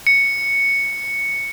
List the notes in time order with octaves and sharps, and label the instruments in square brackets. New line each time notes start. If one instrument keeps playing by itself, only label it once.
[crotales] C#7